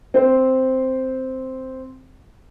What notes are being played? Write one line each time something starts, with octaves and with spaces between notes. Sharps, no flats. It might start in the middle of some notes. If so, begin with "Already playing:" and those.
C4 C5